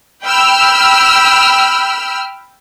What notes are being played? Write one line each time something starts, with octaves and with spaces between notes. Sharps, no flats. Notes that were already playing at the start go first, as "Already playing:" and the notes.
G5 B5 E6 F6